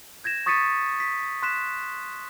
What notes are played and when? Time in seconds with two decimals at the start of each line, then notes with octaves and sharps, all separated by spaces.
0.24 G6 G#6 A#6 E7
0.46 C#6 D#6 A6 B6 C#7 D#7
1.00 B6
1.43 C6 F#6 B6 E7